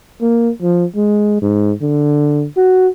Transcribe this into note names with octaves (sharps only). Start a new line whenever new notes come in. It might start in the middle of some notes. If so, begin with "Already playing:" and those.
A#3
F3
G#3
G#2
D3
F#4